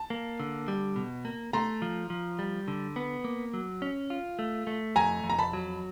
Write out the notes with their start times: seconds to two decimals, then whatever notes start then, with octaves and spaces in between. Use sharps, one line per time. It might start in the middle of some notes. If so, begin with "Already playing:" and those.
Already playing: A5
0.10 A#3
0.40 D3
0.68 G3
0.96 B2
1.25 A#3
1.53 A3 A#5 C6
1.82 F3
2.10 F3
2.39 G3
2.68 D3
2.96 B3
3.24 A#3
3.54 F#3
3.82 C#4
4.10 F4
4.39 A3
4.67 A3
4.96 F2 G#5 A#5
5.24 F2
5.30 A#5
5.38 A5 B5
5.53 F#3